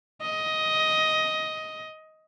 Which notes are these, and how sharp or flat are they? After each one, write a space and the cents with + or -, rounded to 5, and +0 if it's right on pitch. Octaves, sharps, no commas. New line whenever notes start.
D#5 +10